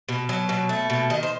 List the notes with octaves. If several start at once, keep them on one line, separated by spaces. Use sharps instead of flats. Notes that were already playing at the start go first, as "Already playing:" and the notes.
B2
F#3
B2
A3
B2
D#3 D#5
C5